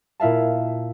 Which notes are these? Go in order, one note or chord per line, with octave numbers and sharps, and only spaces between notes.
A#2 E4 E5 F5 A5